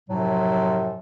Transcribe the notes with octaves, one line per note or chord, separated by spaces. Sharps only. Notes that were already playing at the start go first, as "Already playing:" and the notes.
F#2 A2 C3 F3 F#3